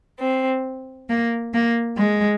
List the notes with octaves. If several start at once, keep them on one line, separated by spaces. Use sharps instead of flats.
C4
A#3
A#3
G#3